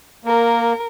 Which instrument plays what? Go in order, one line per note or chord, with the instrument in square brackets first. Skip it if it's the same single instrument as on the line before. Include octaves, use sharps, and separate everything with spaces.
[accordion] A#3 [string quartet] A#4